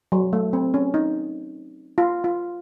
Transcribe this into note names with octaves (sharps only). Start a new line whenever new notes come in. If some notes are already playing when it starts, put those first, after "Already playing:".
F#3
A3
C4
C#4
D#4
F4
F4